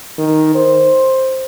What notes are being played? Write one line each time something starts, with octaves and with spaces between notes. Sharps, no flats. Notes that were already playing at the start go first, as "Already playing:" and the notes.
D#3
C5